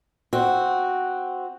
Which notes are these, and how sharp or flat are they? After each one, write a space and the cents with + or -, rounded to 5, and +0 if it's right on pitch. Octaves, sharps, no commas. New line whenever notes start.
C4 +0 F#4 +0